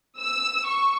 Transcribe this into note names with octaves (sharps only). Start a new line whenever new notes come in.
E6
C#6